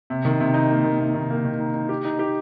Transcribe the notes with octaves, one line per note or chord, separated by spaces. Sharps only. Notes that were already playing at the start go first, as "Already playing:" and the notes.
C3
D#3
C3
D#4
A#3
D#3
C3
D#3
A#3
D#3
D#4
D#4
G4
D#4
G4